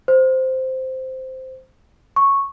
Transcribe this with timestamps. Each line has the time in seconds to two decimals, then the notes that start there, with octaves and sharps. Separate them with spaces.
0.08 C5
2.16 C#6